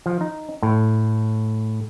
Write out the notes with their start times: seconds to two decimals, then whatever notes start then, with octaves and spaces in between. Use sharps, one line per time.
0.06 F3
0.21 D#4
0.62 A2